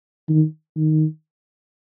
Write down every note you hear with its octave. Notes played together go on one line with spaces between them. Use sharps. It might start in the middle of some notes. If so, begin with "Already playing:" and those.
D#3
D#3